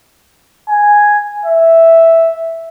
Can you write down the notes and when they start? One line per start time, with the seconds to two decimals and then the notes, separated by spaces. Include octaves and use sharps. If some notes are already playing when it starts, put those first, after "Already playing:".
0.69 G#5
1.46 E5